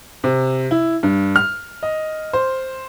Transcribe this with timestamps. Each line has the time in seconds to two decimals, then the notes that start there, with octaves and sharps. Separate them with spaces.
0.24 C3
0.71 E4
1.03 G2
1.36 F6
1.83 D#5
2.33 C5